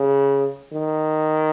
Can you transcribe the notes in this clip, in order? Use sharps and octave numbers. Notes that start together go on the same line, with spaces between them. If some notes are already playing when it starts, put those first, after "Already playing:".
Already playing: C#3
D#3